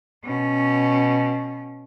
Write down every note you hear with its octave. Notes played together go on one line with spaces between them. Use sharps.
B2 C#4